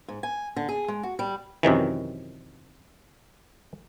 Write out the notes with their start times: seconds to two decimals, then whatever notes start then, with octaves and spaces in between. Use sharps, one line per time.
0.08 G#2
0.23 G#5
0.56 D3
0.69 G#4
0.88 G#3
1.03 F#4
1.19 G3
1.63 F#2 C3 D#3 E3